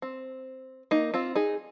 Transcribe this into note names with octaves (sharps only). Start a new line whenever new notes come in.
C4
A#3 D#4
C4 F4
D#4 G#4